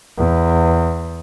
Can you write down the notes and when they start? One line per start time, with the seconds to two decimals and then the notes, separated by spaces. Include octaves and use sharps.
0.18 E2